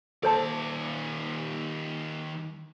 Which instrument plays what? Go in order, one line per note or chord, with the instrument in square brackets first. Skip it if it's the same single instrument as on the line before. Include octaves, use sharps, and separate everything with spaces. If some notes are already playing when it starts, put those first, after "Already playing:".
[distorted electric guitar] D#2 D5 [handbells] A4 C5 A5